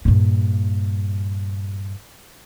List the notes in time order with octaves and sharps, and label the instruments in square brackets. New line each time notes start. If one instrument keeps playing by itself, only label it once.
[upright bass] G2 A#2